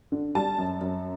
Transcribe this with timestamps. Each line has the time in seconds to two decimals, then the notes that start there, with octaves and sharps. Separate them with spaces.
0.12 D3
0.35 G3 A5
0.58 F#2
0.81 F#2